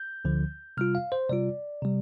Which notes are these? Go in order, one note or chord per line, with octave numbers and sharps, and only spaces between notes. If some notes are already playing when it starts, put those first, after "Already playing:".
Already playing: G6
D2 D3 F3
C3 G3 F4 F6
F5
C5
C3 G3 F4 D5
C3 G3